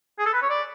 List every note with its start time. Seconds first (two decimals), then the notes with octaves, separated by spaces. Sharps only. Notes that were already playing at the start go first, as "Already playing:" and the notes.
0.19 G#4
0.26 A4
0.34 B4
0.42 C#5
0.50 D5